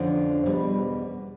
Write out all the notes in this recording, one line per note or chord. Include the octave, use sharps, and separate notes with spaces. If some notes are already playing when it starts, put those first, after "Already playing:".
Already playing: F2 D3 F3 C#4
E2 B2 G3